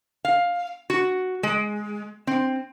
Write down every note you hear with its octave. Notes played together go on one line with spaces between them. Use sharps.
F5
F#4
G#3
C4